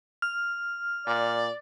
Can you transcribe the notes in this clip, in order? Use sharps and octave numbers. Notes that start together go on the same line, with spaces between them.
F6
A#2 D5